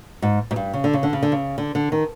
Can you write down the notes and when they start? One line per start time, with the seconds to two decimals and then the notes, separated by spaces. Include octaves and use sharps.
0.22 G#2
0.51 G#2
0.56 G2
0.73 C#3
0.84 D3
0.93 C#3
1.03 D3
1.13 C#3
1.23 D3
1.32 C#3
1.58 D3
1.75 D3
1.92 D#3